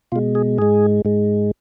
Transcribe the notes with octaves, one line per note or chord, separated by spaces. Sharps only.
B2 G#3 F4
G#4
G#2 G#3 G#4
G#2 G#3